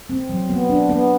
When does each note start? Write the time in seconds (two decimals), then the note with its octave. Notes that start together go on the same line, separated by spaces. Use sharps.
0.10 C4
0.29 F#3
0.50 B3
0.70 D4
0.89 B3